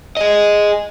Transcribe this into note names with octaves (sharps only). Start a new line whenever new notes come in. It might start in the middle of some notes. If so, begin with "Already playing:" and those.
G#4 D#5